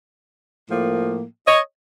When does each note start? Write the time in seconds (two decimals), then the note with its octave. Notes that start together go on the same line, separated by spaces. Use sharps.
0.68 A2 F3 A#3
1.46 C#5 D#5